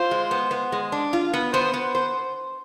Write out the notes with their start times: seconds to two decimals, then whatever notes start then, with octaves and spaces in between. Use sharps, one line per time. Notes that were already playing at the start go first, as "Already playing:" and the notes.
Already playing: F4 C5
0.11 G#3
0.31 B3
0.51 B3
0.72 G#3
0.92 D4
1.13 F4
1.33 B3
1.53 B3 C5
1.74 B3
1.95 C5